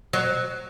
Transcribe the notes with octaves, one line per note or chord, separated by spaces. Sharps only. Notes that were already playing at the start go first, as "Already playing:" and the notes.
F#3